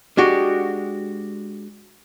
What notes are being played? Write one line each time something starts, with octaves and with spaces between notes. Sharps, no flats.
G#3 D4 F#4 G4